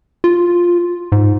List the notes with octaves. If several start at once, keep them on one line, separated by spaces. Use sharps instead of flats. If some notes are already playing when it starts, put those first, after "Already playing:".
F4
G#2